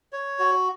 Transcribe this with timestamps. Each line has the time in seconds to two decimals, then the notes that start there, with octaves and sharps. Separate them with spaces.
0.13 C#5
0.39 F#4